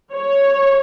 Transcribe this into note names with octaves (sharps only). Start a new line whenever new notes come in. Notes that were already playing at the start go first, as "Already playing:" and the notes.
C#5